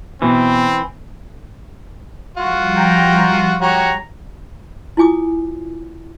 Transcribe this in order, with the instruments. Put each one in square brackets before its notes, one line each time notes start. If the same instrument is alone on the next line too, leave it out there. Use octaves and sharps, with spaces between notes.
[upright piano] B2 [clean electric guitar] E3 [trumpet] C4
[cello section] F3 G3 [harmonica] F4 F#4
[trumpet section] G5 A#5
[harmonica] F#4 G4 C#5 [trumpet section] A#5
[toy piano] E4 F4 G#5 D6 D#6